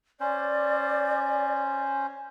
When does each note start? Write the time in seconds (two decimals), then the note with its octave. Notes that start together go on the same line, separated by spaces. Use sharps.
0.20 C#4 C5 D5